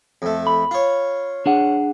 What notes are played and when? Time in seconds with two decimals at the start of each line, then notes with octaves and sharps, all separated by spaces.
0.22 F2 A3
0.47 B5
0.71 F4 C#5
1.46 D4 G#4 F#5